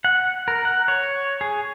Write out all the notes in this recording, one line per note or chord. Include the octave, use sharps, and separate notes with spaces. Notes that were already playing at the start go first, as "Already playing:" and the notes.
F#5
A#4
F#5
C#5
G#4